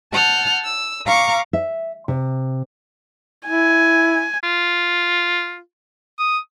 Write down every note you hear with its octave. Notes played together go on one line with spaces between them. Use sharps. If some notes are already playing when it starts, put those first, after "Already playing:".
F#5 A5 F6 G6
E6
F5 A#5 C#6 D6
E5
C3
E4 G#5
F4
D#6